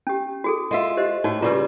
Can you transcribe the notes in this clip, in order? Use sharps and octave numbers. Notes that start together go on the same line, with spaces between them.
C#4 G4
F#4 G#4 A4
G#3 F4 E5
G4 C5 D#5
A2 D#4 F#4
C#3 G3 F4 G4 B4